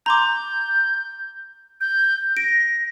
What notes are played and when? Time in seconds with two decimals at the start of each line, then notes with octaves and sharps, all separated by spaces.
0.06 A#5 C6 D6 G6
1.81 G6
2.37 A#6 D7